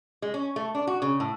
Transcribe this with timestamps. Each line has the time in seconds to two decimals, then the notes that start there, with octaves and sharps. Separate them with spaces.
0.22 G#3
0.34 C#4
0.56 A3
0.75 D4
0.87 F#4
1.02 C#3
1.20 A2